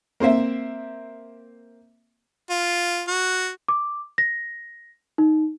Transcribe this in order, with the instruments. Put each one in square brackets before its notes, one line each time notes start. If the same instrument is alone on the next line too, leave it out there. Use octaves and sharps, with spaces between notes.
[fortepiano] A#3 C4 C5 E5
[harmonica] F4
F#4
[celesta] D6
A#6
D#4